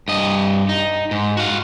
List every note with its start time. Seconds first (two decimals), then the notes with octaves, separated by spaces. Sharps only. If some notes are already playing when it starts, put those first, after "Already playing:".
0.08 G2 D#5
0.69 D#4
1.11 G#2
1.37 F#4 F5